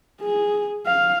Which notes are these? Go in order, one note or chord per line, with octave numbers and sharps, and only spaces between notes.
G#4
F5